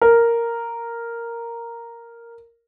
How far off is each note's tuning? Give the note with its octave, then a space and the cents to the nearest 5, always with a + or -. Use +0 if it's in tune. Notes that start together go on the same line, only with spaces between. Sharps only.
A#4 -5